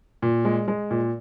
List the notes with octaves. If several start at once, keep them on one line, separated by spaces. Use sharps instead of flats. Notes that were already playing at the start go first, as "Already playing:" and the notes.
A#2
G#3
G#3
A#2